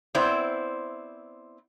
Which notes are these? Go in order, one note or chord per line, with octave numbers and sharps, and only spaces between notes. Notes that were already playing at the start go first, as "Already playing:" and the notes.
B3 C4 E4 C5 D5